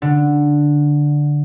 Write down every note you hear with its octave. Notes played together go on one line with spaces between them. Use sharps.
D3